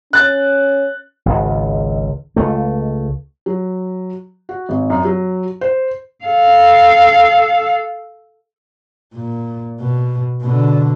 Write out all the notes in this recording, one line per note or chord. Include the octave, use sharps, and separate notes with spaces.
C#4 F#6 A6
G#1 C#2
C#2 A3
F#3
F#4
G#1
F#2
F#3
C5
A4 F5
A#2
B2
B2 D3